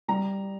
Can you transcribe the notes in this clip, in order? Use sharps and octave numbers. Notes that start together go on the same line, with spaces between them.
G3 A#5